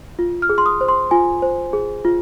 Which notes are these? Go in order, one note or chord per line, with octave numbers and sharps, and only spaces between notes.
F4
F6
G#4
C6
D#6
C5
C6
F4 G#5
C5
G#4
F4